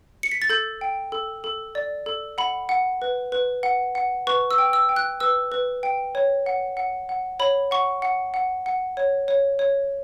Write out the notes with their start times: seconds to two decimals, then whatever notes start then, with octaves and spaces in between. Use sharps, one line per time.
0.23 C#7
0.32 B6
0.42 A6
0.49 A4 G6
0.81 G5
1.12 A4
1.44 A4
1.75 D5
2.06 A4
2.38 F#5 B5
2.69 F#5
3.02 B4
3.32 B4
3.63 F#5
3.95 F#5
4.27 B4 C#6
4.51 E6
4.58 G5
4.73 E6
4.89 G5
4.96 F#6
5.20 B4 E6
5.52 B4
5.83 G5
6.15 C#5
6.46 F#5
6.77 F#5
7.09 F#5
7.40 C#5 B5
7.71 F#5 C#6
8.02 F#5
8.34 F#5
8.66 F#5
8.97 C#5
9.28 C#5
9.59 C#5